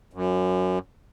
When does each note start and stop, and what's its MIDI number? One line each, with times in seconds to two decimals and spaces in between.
0.13 0.79 42